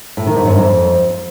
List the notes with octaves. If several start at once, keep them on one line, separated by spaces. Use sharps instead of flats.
A2
D#3
G#2
F#2
F2